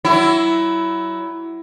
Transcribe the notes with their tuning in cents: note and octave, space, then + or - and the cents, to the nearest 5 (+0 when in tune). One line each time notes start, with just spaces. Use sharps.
F#3 +25 E4 +5